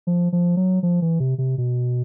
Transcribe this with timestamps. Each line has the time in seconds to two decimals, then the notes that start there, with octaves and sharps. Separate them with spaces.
0.07 F3
0.33 F3
0.57 F#3
0.83 F3
1.02 E3
1.20 C3
1.38 C3
1.58 B2